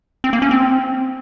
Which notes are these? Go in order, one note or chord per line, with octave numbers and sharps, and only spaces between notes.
C4
A#3
C#4
C4